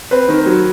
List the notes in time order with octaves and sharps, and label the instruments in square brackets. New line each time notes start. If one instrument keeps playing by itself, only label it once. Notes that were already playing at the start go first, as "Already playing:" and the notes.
[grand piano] C4 B4
D#3
F#3